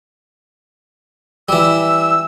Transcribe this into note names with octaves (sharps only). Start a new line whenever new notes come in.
E3 G3 E6